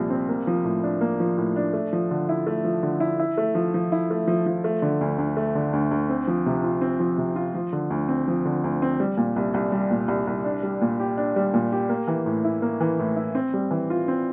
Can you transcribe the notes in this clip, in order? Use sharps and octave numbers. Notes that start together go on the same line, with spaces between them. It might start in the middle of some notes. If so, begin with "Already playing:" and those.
Already playing: C2 A#2 F3 C4
C4
A#3
F3
A2
D4
A#3
F3
A2
D4
A3
F3
D3
E4
A3
F3
D3
E4
E4
A3
F3
F3
E4
A3
F3
F3
A3
D3
D2
D2
A3
D3
D2
D2
C4
F3
C3
F4
C4
F3
C3
F4
F3
D3
D2
C4
F3
D3
D2
C4
G3
A#2
C2
C2
G3
A#2
C2
C2
D4
G3
A#2
G4
D4
G3
A#2
G4
A#3
E3
A2
E4
A#3
E3
A2
E4
C4
G3
E3
F4
C4